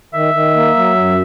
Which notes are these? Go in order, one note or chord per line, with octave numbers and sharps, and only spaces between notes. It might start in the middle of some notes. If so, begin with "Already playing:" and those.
D#3 E5
D#3
A#3
F#3
F#2